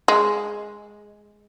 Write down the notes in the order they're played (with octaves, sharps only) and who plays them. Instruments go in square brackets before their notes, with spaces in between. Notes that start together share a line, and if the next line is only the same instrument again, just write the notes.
[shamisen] G#3